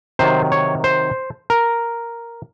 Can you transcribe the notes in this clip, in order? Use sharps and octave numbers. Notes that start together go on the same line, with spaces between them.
C3 D#3 F#3 C5
C#5
C5
A#4